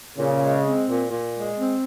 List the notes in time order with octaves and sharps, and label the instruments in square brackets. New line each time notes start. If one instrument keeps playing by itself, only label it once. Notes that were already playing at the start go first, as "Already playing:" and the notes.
[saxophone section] A#2 [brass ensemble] C#3
[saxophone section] G#3
C4
A#2
A#2
G#3
C4